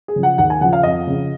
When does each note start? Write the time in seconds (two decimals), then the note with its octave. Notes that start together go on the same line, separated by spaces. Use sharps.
0.08 G#4
0.16 C#3 F3
0.23 F#5
0.38 D#2 F#5
0.50 G#5
0.61 C#3 F3 F#5
0.73 F5
0.83 F2 D#5
1.07 C#3 F3